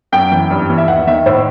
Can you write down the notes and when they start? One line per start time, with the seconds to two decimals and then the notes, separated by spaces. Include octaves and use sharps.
0.12 F#2 G5
0.31 E3
0.50 G2
0.70 E3
0.78 E5
0.88 D#2 F#5
1.07 D#3 E5
1.26 A2 C5